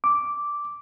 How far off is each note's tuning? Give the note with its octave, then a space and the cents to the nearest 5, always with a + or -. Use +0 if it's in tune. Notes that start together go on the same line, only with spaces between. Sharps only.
D6 -5